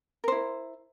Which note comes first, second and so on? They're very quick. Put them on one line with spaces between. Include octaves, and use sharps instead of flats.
A#4 C5 E4